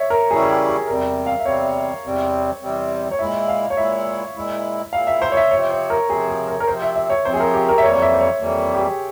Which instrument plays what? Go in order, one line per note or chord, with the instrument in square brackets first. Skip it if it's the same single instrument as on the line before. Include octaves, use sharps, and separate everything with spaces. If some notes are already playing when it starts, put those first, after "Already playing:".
Already playing: [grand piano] C#5 E5
A#4
[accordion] C#3 E3 G3 C#4 E4 [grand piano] G#4
[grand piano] G#4
G4
G#4
[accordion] E2 C3 G3 C4 [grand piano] A#4
[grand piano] F5
E5
[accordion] E2 C3 G3 C4 [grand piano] C#5
[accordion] E2 C3 G3 C4
E2 C3 G3 C4
[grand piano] C#5
[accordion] A#2 G#3 E4 [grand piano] E5
[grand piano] F5
C#5
[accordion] A#2 G#3 E4 [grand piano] E5
[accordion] A#2 G#3 E4
[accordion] A#2 G#3 E4 [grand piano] F5
[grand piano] E5
C5
C#5
E5
[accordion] C3 F3 C4 [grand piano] C#5
[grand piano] C5
A#4
[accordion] C3 F3 C4 [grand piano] G#4
[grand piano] G#4
A#4
A#4
[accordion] C3 F3 C4 [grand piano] C5
[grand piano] E5
E5
C#5
[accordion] C3 F3 C4 [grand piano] C5
[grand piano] G#4
A#4
G4
A#4
E5
[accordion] F2 E3 G3 A#3 [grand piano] C#5
[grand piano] C#5
E5
C5
C#5
[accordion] F2 E3 G3 A#3
[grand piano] G4
G#4